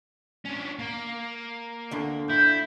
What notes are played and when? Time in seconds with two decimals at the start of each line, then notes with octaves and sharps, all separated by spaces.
0.45 C#4 D4
0.79 A#3
1.91 D2 D3
2.30 E4 G6